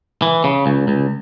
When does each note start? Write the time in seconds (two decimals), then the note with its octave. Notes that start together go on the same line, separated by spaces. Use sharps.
0.22 E3
0.44 C#3
0.66 C#2
0.88 C#2